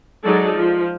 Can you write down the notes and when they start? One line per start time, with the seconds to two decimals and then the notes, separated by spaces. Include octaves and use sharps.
0.25 F#3 G#3 D#4 G#4 A4 D5
0.55 F3